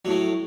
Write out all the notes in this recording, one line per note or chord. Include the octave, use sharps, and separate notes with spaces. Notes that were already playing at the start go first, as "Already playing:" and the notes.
A2 F#3 A3